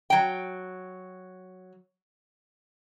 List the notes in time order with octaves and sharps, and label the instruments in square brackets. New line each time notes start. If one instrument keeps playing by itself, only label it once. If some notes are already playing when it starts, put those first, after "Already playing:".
[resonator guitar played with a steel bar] F#3 G5